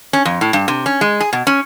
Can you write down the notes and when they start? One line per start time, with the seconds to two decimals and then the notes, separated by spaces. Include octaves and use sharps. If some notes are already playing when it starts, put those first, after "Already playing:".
0.13 C#4
0.25 F2
0.41 A2
0.53 G2
0.68 C3
0.86 C#4
1.01 G#3
1.20 G#4
1.33 B2
1.47 C#4